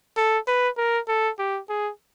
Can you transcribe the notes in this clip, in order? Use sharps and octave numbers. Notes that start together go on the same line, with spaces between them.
A4
B4
A#4
A4
G4
G#4